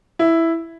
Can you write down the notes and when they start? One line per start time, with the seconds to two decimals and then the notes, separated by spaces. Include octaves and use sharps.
0.19 E4